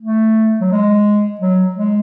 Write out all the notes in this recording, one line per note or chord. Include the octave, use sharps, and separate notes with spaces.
A3
F#3
G#3
F#3
G#3